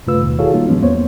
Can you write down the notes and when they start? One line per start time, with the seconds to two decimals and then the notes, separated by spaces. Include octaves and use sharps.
0.07 G2 C#3 A3 F4 B4 E6
0.21 D#2 B2 D#3
0.39 E4 F#4 G#4 A4 C#5 F5
0.53 G3 A#3 D#4 F4
0.69 G#2 E3 F3 G#3 B3 C#4
0.82 E2 A#3 B3 C5 C#5